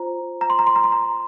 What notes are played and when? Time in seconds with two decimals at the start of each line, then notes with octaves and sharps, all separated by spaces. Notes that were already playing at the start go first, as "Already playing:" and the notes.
Already playing: F4 C5 A#5
0.41 A#5
0.50 C6
0.59 A#5
0.67 C6
0.76 A#5
0.84 C6
0.92 A#5